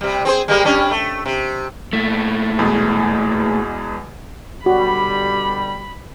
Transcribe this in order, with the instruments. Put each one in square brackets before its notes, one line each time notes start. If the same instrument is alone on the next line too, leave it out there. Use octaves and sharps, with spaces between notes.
[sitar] C3 G3
C4 G#4 C5
G3 G#3 A#3
G3 C#4 D4
A3
C3
[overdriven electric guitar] A#2 A3
[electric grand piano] E2 B2 G#3
[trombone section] B2 D3 G3 [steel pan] F#4 [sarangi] B5